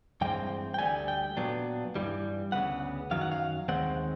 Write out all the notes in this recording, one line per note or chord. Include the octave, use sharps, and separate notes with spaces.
G2 E3 G#3 C4 G5
G5
D2 D3 G3 G#5
G5
A#2 F#3 B3 D4
G2 E3 G3
D2 C#3 F#3 B3 F#5
F#2 D#3 F#3 F5
F#5
F5
D#2 D#3 G#3 C4 F#5